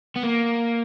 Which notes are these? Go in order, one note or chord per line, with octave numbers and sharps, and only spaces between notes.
B3
A#3